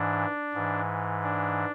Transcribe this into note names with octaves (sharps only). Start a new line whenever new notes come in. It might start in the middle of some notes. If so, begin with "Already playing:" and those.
Already playing: G#2 E3 D4
G#2 E3
D4